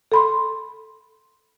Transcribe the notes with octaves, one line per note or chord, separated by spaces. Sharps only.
A4 B5 C6